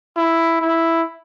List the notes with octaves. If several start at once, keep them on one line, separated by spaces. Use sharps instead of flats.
E4
E4